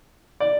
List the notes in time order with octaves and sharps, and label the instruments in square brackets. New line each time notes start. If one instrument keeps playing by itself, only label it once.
[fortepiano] D5